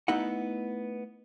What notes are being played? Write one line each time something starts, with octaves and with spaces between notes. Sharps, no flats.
A3 B3 D#4 E4 D#5 F#5